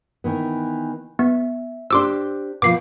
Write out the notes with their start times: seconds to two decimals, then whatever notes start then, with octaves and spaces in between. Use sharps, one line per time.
0.24 D#3 E3 B3
1.19 B3 E5
1.91 D4 G4 C5 C6 D6 E6
2.62 B2 F3 D6 C7